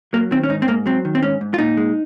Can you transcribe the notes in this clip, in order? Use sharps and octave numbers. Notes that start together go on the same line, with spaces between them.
F#3 A#3
D#3 C4
C#4
G#2 D#4
C4
G#2 A#3
F#3 C4
D#3
C4
G#2 C#4
G#2
F4
A#2 D#4
G#3